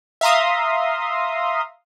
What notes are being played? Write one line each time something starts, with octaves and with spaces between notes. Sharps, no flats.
E5 F5 A#5 C6 D#6